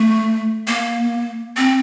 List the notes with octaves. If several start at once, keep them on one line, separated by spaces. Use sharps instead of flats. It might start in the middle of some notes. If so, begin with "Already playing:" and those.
Already playing: A3
A#3
C4